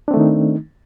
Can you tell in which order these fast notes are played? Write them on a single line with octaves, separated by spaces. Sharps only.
D4 C4 A3 D#3 D#4